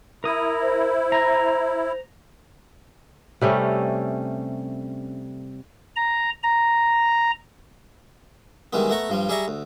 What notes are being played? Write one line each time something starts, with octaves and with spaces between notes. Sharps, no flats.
E4 A#4 D#6
C5
A#5
C3 G3 A3 C#4
A#5
A#5
D#3 E3 G3 G#3 B3
A3 B3 A#5 C#6
G2 F3 G3
G3 G#4 D5 E5 A#5 C#6
D2